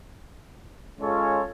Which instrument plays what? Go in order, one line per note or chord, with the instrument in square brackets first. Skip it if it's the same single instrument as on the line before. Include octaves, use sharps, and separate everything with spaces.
[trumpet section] G#3 C#4 F4 A4 C#5